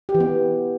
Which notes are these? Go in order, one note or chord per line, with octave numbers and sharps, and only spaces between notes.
G4
E3
B3